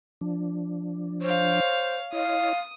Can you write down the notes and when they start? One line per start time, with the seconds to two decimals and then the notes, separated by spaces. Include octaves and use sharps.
0.21 F3 D4
1.22 C5 C#5 F5
2.12 E4 C#5 D#5 F5 D#6